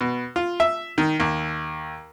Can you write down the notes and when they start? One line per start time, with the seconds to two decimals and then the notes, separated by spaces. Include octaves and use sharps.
0.01 B2
0.36 F4
0.60 E5
0.98 D#3
1.20 D#2